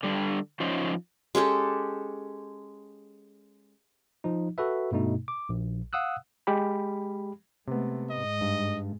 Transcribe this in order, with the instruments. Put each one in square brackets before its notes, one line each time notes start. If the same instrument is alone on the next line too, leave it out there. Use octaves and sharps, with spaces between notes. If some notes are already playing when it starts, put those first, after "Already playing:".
[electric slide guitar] D3 G3 D4
F3 C#4 D#4 C5
[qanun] G#3 C#4 G4 A4
[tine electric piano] F3 D#4
F#4 A4 B4 E5
G2 B2 A3 D#4
D6
A#1
F5 F#5 D#6 E6 F#6
[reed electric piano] G#3 G4 B5
[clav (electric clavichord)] C3 B3 [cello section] G#3 A3
[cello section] G#2 [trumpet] D#5
[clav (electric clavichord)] G2